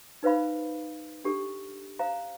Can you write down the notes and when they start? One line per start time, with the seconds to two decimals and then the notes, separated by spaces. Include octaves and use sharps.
0.23 D#4 B4 C5 F5 B5
1.24 D4 G4 A4
1.99 C5 F5 A#5